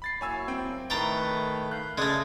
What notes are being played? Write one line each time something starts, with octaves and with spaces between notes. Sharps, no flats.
B5 A6 C7
F#3 A#3 E4 C#5 G#5 E6
C4 G5
A2 D#3 A3 B4 G5 A5 A#5
F5 F#6 G6
C#3 G#3 A3 D5